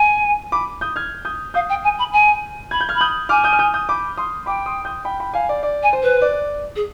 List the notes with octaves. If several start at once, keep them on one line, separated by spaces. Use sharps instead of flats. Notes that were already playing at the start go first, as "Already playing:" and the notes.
Already playing: G#5
B5 D6
D#6 G6
F6 G#6
D#6 G6
F5 D#6 G6
G5
G#5
B5
G#5
B5 G#6
G6
F6 G#6
B5
D#6 G6
G#5 D6 F6
D#6 G6
F6
D#6 G6
D#6 G6
B5 D6
C6 D#6
G5 B5 D6
C6 D#6
D#6 G6
G5 B5
G5 B5
F5 G#5
D5
D5
G#5
C5
B4
D5
G#4